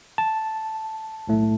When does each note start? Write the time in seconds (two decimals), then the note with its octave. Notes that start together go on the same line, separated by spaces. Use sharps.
0.18 A5
1.27 B1 A2 A3